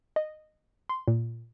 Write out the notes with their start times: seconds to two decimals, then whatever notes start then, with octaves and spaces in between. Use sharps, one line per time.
0.16 D#5
0.89 C6
1.08 A#2